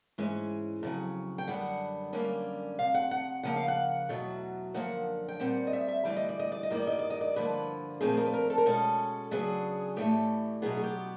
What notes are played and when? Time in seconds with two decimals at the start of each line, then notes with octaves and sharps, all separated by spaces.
0.18 G#2 E3 G#3 C#4
0.83 F2 C#3 F#3
1.38 G5
1.47 F#2 D3 G3 B3 F#5
2.13 F#2 D3 G3 A#3 C#4
2.79 F2 C3 F5
2.94 F#5
3.11 F#5
3.43 C#3 F3 A#3 F#5
3.56 F5
3.68 F#5
4.09 E2 B2 F#3 A3
4.74 F#2 D3 F3 A#3 F#5
5.28 G5
5.40 A#2 G3 C4 F#5
5.67 D#5
5.73 E5
5.88 E5
6.05 D2 C3 E3 G3 D5
6.16 D#5
6.29 D5
6.39 D#5
6.52 D5
6.63 D#5
6.70 G2 D#3 G3 A#3 D5
6.87 D#5
6.99 D5
7.10 D#5
7.21 D5
7.36 G2 D3 F3 A#3 B4
8.01 A#2 F3 A3 C4 G#4
8.17 A#4
8.26 B4
8.34 A#4
8.50 A4
8.58 A#4
8.66 B2 G#3 C#4 A4
9.31 C#3 F#3 B3 D4 G#4
9.96 A2 E3 A3 D4 G4
10.62 B2 F#3 B3 G#4
10.77 G#4
10.83 G4